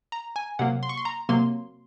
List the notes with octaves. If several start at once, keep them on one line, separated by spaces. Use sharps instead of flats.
A#5
G#5
C3 F#3 A#3 F#5
C6
C#6
C6
A#5
C3 F#3 A#3 C6